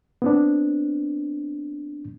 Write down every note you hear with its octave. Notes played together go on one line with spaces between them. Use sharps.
B3 C4 D4